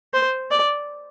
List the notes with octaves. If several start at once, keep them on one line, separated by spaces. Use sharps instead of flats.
C5
D5